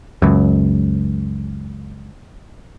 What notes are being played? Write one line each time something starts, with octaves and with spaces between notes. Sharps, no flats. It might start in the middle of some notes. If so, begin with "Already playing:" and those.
C#2 F#2